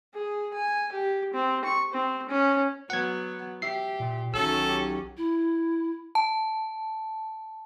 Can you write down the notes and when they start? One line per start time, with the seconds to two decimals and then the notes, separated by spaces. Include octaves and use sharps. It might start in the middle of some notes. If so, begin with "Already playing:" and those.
0.14 G#4
0.53 G#5
0.92 G4
1.33 C4
1.64 C#6
1.93 C4
2.28 C#4
2.90 F#3 B3 F#5 G#6
3.62 G4 E5 C7
4.00 A#2
4.34 B1 D#3 F#3 C#4 A4 E6
4.69 G4
5.17 E4
6.15 A5